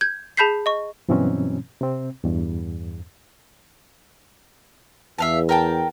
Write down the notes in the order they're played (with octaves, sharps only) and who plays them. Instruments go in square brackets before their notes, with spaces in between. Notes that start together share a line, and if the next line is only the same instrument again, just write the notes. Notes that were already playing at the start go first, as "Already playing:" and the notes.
[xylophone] G6 G#6
G#4 A5 B5 G6 B6 C7
D#5 C#6
[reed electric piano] G2 B2 E3 F#3 C4 C#4
C3 C4
E2 G2
[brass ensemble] E2 [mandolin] E5 F5 A5
[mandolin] A#4 G5 A5